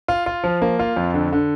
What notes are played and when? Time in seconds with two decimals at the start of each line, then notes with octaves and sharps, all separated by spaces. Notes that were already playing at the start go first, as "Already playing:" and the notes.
0.08 F4
0.26 F4
0.44 F3
0.62 A#3
0.79 F4
0.96 F2
1.14 D3
1.33 D3